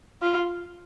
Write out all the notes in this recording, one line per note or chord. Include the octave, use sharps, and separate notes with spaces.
F4